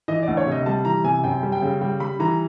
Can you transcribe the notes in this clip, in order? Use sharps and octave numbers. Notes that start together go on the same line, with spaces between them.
E3 D#5
D2 D5
C#5
C3 D#5
G3 A5
E3 A#5
C3 G#5
F#2 G5
G3
G5
C#3
G3 G5
G3 B5
E3 A#5